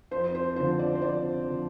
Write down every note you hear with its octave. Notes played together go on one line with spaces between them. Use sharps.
F2 C5
C5
D3 F3 C5
D5
C5
F2 D5
D3 F3